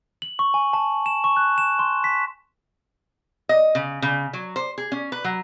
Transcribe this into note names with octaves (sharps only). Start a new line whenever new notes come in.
F#7
C#6
G#5
A5
E7
C#6
F#6
E7
C6
B6
D#5
C#3
C#3
F#3
C5
G#4
C#4
B4
F#3